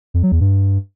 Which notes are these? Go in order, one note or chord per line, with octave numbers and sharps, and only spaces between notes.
F2
F#3
E2
G2